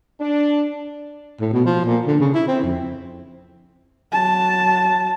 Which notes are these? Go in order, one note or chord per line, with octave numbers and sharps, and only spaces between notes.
D4
A2
B2
F3
A#2
D3
C#3
E4
C4
F2
F#3 A5